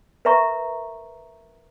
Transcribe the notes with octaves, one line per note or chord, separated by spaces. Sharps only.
A#4 B4 E5 A#5 C#6